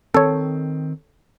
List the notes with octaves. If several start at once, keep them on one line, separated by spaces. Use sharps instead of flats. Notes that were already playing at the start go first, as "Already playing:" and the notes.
D#3 C4 A4 C#5